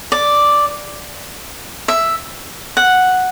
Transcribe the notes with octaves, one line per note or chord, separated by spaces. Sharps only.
D5
E5
F#5